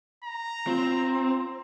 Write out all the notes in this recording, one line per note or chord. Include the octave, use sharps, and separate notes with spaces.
A#5
C4 F4 C6